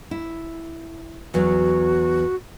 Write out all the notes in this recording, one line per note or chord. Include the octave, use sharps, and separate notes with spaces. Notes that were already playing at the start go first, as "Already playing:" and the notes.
E4
E2 F#3 F#4